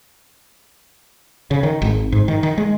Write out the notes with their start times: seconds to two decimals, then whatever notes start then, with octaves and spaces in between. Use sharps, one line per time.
1.51 C#3
1.63 D#3
1.82 G#1
2.12 G#2
2.28 D#3
2.43 D#3
2.58 G#3